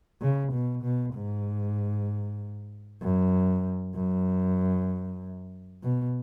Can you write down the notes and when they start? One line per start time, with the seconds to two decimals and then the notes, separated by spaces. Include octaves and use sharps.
0.22 C#3
0.53 B2
0.84 B2
1.14 G#2
3.02 F#2
3.95 F#2
5.84 B2